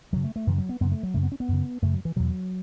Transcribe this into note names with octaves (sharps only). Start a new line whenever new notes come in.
F#2 C#3 F#3
A3
A3
F#2 C#3 E3
F#3
B3
F#2 C#3 B3
A3
F#3
F#2 C#3 A3
B3
C#4
B3
F#2 C#3
F#2 C#3 A3
F#3
E3
E2 B2 F#3